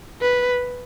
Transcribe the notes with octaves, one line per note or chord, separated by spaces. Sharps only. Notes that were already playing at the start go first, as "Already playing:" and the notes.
B4